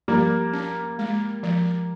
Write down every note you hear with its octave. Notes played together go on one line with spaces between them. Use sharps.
F3 G3 A#3
C#4
G#3
F3